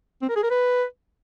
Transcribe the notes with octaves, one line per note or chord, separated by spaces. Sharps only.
C4
A#4
G#4
A#4
B4